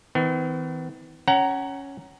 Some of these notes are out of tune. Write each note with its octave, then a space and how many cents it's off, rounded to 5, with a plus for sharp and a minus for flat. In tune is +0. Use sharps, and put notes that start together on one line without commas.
E3 -45 B3 +45
C#4 +0 F#5 +30 A#5 +0